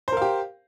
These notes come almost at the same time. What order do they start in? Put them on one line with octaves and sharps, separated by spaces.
C5 A#4 F5 G4